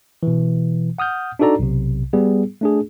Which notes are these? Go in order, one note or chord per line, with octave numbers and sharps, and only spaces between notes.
B2 E3
F#5 D#6 F6 G6
D4 D#4 F#4 A4 D5 A#5
B1 C3
G3 B3 G#4
A3 D4 G#4